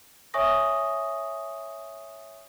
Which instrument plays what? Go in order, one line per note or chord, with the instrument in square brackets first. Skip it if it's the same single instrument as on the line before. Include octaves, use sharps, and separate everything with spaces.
[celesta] C#5 E5 G#5 C#6 D#6 A#6